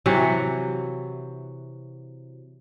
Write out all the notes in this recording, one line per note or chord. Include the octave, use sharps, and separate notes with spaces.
C3 E3 F#3 F#4